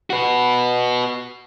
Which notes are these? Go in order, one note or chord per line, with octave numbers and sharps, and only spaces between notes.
F#4 B4